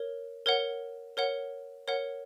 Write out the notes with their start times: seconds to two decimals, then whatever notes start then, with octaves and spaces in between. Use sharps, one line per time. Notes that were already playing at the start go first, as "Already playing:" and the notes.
Already playing: A#4 C#5
0.46 A#4 C#5 F#5
1.17 A#4 C#5 F#5
1.88 A#4 C#5 F#5